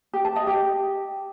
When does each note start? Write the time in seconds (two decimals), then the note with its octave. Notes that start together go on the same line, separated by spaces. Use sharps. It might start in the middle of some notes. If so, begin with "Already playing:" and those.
0.14 G4
0.25 A5
0.36 D#5
0.47 G4